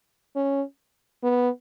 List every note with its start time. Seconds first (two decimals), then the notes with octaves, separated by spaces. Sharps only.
0.36 C#4
1.23 B3